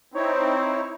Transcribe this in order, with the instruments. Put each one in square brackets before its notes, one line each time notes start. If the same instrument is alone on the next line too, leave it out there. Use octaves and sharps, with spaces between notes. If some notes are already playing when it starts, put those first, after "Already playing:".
[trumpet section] C4 [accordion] D#4 E4 [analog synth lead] C#5